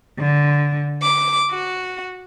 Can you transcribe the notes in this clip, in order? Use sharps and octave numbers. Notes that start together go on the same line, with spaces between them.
D3
D6
F#4